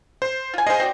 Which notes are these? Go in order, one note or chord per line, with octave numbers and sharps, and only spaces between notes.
C5
F4 G#5
G#4 C5 D#5 F5 G#5
C4 F#4 D5